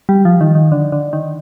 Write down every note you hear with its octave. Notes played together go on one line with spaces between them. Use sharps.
G3
F3
D#3
D#3
D3
D3
D#3